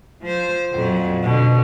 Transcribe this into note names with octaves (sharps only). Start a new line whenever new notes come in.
F3 C5
F2 A#2 F#3
B2 D3